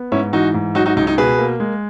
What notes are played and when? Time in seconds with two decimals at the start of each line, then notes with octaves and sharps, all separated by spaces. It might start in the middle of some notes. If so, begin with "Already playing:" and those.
Already playing: B3
0.12 G#2 C#4 E4
0.33 E3 D#4 F#4
0.54 G#2
0.75 F#3 D#4 F#4
0.86 D#4 F#4
0.96 C#2 D#4
1.07 D#4
1.18 B2 G#4 B4
1.39 A#3
1.60 G#3